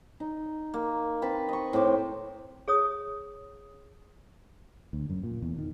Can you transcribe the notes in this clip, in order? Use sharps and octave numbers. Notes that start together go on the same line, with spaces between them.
D#4
A#3
C4 B4 A5 B5
D#5 C#6
A2 C4 C5 D6
G#4 C#5 D#6
D2
F#2
A#2
E2
D#3